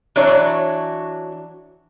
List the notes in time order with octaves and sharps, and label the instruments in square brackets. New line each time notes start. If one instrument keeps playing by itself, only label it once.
[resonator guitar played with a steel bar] E3 F#3 D4 C#5